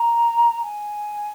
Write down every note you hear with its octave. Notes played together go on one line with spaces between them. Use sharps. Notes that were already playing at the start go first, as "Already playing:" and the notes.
Already playing: A#5
G#5